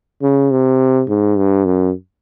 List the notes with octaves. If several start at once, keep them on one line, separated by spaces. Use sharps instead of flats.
C#3
C3
G#2
G2
F#2